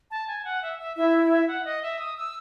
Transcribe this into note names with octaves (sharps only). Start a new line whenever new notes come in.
A5
G#5
F#5
E5
E5
E4 E5
E5
F#5
D#5
E5
D#6
E6